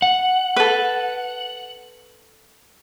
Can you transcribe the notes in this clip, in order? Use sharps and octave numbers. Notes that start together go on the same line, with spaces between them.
F#5
A4 B4